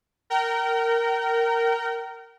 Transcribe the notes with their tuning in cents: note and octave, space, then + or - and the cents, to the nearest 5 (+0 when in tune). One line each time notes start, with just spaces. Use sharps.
A#4 -10 G5 -40